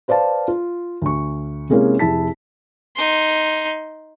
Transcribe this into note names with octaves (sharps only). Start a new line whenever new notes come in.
B4 C5 D5 F5 A5
F4
D2 C#6
C3 G#3 A#3 C#4 E4 G#4
F1 E4 G#4 A5 B6
D#4 C6